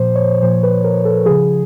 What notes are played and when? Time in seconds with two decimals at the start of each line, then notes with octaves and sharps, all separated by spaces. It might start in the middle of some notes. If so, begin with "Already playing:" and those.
Already playing: A#2 F3 C5
0.15 C#5
0.43 A#2 F3 C5
0.63 B4
0.84 A#4
1.05 A4
1.25 C#3 F3 G#4